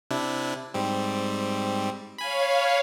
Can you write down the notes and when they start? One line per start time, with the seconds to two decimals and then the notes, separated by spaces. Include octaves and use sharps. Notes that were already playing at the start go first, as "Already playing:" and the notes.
0.11 C3 D4 E4
0.74 G#2 G3 C4
2.18 C#5 F5 G#5 B5